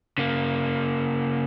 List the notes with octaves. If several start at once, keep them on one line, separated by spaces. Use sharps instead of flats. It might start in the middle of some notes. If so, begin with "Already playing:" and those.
C#3 A#3